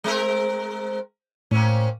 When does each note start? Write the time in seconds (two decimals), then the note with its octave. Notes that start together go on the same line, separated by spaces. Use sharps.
0.04 G#3 C4 A#4
1.51 A2 A#3 C4 C#4